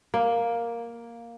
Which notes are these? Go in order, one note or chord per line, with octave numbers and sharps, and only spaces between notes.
A#3